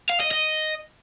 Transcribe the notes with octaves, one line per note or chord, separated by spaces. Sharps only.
F5
D#5
D#5